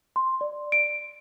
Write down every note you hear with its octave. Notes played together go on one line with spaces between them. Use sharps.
C6
D5
D7